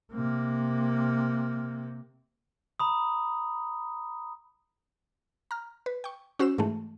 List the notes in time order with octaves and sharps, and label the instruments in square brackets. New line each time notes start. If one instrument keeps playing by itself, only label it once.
[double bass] C3 A#3
[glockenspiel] A#5 B5 D#6
[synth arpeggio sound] A#5 F6
B4
G5 C#6
C#4 F#4 C5 E6 E7
G#2 E3 G#3 A3